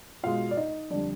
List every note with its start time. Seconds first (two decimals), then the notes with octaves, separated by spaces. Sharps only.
0.23 B2 G#3 F4 F5
0.51 D5
0.57 D#4 D#5
0.90 F2 D3 G3 D4 D5